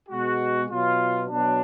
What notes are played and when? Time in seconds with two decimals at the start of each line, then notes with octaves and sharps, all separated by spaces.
0.09 B2 G#3 F#4
0.69 B2 F#3 F4
1.29 B2 F#3 D4